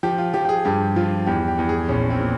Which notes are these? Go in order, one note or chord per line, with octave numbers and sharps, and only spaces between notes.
F3 G4
F4
F3 G4
G4
G#4
G2 G4
F3 F4
E2 G4
G4
E2
G#4
A#1 C#4
C4
A#2